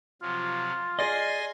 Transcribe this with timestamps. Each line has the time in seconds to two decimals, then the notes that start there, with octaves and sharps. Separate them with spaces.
0.22 C3 F3 F#3 F4
0.99 G#4 D5 D#5 G#5 C6 A#6